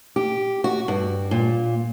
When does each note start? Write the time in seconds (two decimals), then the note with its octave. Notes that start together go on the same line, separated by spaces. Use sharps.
0.16 G4
0.64 F#4
0.88 G2
1.31 A#2